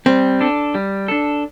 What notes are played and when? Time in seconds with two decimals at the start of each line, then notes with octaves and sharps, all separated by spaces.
0.06 G3 C4
0.41 D4 A4
0.75 G3
1.08 D4 A4